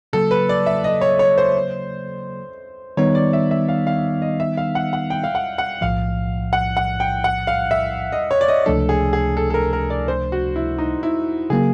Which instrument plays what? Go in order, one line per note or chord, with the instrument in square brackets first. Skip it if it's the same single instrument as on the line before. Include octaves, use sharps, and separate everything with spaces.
[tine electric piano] C#3 F#3 A#3 [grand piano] A4
[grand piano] B4
D5
E5
D#5
C#5
C#5
C5
[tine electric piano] D#3 G3 B3 D#4 [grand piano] C#5
[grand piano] D5
E5
E5
F5
F5
D#5
E5
F5
F#5
F#5
G5
F5
F#5
F#5
[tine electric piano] B1 A2 F3 [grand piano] F5
[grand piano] F#5
F#5
G5
F#5
F5
E5
D#5
C#5
D5
D#5
[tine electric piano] C#2 C3 F3 A3 D4 [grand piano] A4
[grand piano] G#4
G#4
A4
A4
A#4
A#4
D5
C5
F#4
E4
D#4
E4
[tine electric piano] C#3 F#3 A#3 [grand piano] G#4